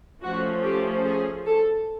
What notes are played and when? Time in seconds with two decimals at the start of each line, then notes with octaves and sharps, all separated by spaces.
0.22 F3 A3 C#4 F#4
0.64 G4
1.06 G#4
1.47 A4